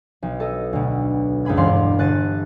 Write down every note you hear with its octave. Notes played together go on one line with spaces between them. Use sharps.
B1
A4 D#5
D2 B2
C#2 F#2 G#4 B5 G#6
E1 G2 D5 F5 C6
G1 F#6 A6 D#7